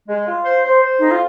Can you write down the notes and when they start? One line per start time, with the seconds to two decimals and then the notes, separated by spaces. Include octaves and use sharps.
0.08 G#3
0.26 F4
0.45 C5
0.63 C5
0.82 C5
0.99 F2 D#4
1.11 F4